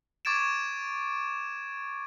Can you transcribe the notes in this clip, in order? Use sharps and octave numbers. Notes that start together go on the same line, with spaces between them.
C#6 D6 G#6 A6 D7 E7